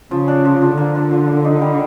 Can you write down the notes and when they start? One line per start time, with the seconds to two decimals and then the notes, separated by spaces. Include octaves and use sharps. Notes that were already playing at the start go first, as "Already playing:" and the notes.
0.11 C#3 F3
0.28 D4
0.45 F3
0.62 F3
0.78 D3 A#3
0.95 D4
1.11 F3
1.28 A#3
1.44 D#4
1.62 G3